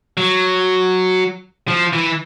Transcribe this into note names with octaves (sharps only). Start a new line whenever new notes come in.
F#3
F3
E3